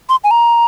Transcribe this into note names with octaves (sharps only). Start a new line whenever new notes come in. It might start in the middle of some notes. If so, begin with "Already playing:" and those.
C6
G#5
A#5